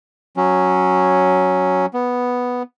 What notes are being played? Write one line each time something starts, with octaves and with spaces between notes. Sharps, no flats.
F#3 C#4
B3